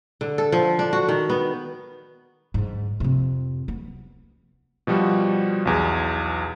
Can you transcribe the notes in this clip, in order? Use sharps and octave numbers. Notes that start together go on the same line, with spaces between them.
D3
A4
F3
D4
F#4
D#3
B3
G#2 D3
F2 C3
B3
B2 F3 G3 F#4
B1 E2 G#4